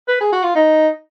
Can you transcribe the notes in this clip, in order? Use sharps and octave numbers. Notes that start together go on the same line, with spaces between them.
B4
G#4
F#4
F4
D#4